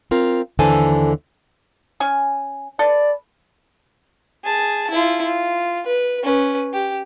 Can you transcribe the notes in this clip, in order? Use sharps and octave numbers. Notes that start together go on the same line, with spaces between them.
C4 F4 A#4
D#2 D3 E3 A4 C5 G#5
C#4 G#5
A4 B4 D5
G#4 A5
E4 F4
F4
B4
C#4 B4
G4